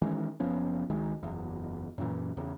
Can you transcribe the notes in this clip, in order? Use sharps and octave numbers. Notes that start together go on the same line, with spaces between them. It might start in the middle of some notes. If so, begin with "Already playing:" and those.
D#3 E3 G#3 C#4
F#1 F3 B3 C#4
C#2 D#3 G#3
F#1 E2
F#2 A#2 E3
E2 C#3